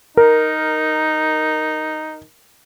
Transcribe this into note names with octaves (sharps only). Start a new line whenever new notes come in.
D#4 A#4